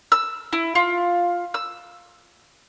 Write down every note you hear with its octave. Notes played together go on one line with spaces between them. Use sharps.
E6
E4
F4
E6